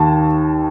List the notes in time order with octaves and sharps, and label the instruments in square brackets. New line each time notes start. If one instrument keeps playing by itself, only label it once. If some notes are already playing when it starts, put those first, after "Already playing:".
Already playing: [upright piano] D#2 D#3 A5